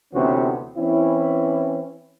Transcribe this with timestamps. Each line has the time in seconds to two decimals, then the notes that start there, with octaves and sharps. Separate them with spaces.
0.13 D2 C3 E3 B3 C#4 F#4
0.77 E3 C4 C#4 E4